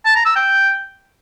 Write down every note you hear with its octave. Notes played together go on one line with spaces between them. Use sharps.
A5
A#5
E6
G5